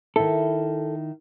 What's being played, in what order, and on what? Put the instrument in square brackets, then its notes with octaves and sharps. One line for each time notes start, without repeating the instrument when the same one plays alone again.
[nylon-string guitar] D#3 E4 [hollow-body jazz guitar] A4